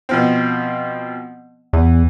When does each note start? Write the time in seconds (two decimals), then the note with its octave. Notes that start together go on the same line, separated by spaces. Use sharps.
0.09 B2 F3 C4
1.73 E2 E3